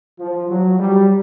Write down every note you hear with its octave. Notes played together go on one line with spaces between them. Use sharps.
F3
F#3
G3